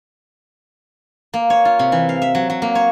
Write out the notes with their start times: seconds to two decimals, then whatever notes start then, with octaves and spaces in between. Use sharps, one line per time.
1.34 A#3
1.50 C#5
1.65 F4
1.79 C3
1.92 E3
2.09 F5
2.22 E5
2.35 F#3
2.50 F#3
2.62 A#3
2.75 C#5